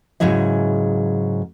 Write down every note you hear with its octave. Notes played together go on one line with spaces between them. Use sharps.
G#2 C#3 F#3 E4 G#4 D#5